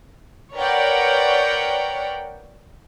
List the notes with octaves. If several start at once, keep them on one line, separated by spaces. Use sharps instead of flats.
A#4 B4 C#5 D5 F#5 G5